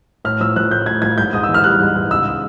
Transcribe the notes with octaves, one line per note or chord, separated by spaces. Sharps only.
A2 F6
F3 E6
F3 F#6
A2 G6
A2 G#6
F3 G#6
G#2 G6
G#2 D#6
E6
E3
F6
G3 F#6
G#2
G#2
C#2 E6